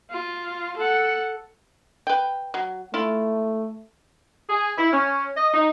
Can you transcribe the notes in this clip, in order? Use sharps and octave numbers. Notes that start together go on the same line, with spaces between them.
F4
A4 F#5
B4 G5
F#3
A3 E4 F4
G#4
E4
C#4
D#5
D#4